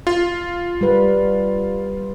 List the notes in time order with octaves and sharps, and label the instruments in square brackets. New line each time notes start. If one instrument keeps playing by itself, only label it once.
[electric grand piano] F4
[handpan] G3 B4